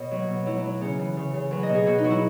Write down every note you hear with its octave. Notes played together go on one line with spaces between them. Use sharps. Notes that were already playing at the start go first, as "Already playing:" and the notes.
Already playing: B2 C#5 D#5
F#3
B2
F#3 E4
E4
F#3
C#3 C#4
E3
C#3
C#3
F#3 B4
D#5
B2
G#4
B2 F#4
D#4
F#3 F#4
E4